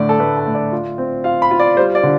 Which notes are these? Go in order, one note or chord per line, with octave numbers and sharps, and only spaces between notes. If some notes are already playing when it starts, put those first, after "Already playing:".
Already playing: A2 D3 A3 D5
A4
A3 B4
A4
A2
D5
F4
C4
F4 F5
B5
F4
D5
G3 C5
D5
D3